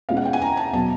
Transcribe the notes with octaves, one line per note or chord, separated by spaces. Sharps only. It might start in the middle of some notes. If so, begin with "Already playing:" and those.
B2 G#3 C#4 E4 F5
F#5
G5
G#5
A#5
A5
B2 F#3 A5